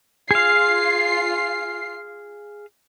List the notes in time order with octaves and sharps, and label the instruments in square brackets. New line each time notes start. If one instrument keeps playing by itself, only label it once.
[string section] F4 C7 [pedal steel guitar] G#4 F5